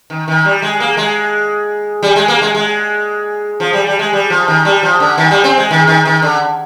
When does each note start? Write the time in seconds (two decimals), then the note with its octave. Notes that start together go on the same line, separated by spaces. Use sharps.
0.10 D#3
0.28 D#3
0.45 G3
0.62 G#3
0.80 A#3
0.97 G#3
2.03 G3
2.16 G#3
2.28 A#3
2.42 G#3
2.55 G#3
3.60 F3
3.73 G3
3.87 G3
3.99 G#3
4.13 G3
4.30 F3
4.48 D#3
4.65 G3
4.83 F3
5.00 D3
5.18 D#3
5.31 G3
5.44 C4
5.58 G#3
5.71 D#3
5.88 D#3
6.05 D#3
6.22 D3